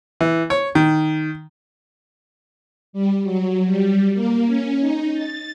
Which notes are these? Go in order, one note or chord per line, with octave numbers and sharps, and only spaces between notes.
E3
C#5
D#3
G3
F#3
G3
A#3
C#4
D#4
A6